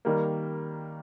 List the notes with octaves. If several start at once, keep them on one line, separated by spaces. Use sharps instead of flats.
D#3 G3 A#3